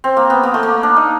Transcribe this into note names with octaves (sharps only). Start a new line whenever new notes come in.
C4
A#3
B3
A#3
A3
A#3
D4
D#4